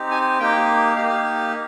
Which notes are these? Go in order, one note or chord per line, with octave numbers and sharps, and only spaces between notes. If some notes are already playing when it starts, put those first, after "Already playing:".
Already playing: C4 D#4 G4
G#5
A#3 D#4 G4 G5
A#3 D#4 G4 F5